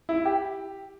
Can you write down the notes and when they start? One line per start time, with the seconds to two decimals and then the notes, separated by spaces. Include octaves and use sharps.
0.09 E4
0.25 G4